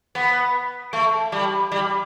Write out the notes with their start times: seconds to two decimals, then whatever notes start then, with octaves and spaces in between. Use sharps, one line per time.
0.15 B3
0.93 A3
1.32 G3
1.72 G3